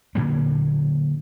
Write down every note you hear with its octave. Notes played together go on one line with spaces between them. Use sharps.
A#2 D3 F#3 A#3